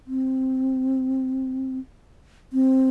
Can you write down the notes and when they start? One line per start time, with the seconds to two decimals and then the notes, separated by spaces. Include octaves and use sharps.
0.07 C4
2.53 C4